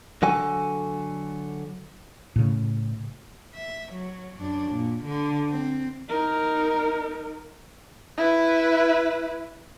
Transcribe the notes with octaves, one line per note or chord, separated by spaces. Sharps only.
D3 F#3 F#4 A4 G#5
A2 C#3
E5
F#3
F#2 D4
A#2
D3
C4
D#4 A#4
E4 B4